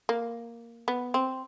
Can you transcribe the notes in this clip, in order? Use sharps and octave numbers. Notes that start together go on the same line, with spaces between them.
A#3
B3
C4